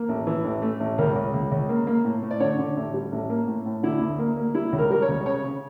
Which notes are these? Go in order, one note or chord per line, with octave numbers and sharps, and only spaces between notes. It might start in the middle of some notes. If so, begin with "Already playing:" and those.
Already playing: A#3
A1
E3
A1
A3
A1
C#2 A#4
C#2
C#2
C#2
A#3
A#3
A2
A2
D5
D3 C#5
D3
A1
G3
A1
A#3
A2
A2
D3 E4
D2
A#3
A#3
G3 E4
C#2
A#4
G3 A#4
C#5
C#2
C#3 C#5
C#3